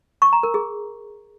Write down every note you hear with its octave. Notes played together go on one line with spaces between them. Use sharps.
C#6
A#5
A#4
G#4